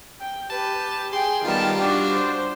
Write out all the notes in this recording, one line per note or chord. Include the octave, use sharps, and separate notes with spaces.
G5
G4 B4 A5
G#4 G5 C6
D#3 G3 B3 F4 A5
D4 F#4 G4
C5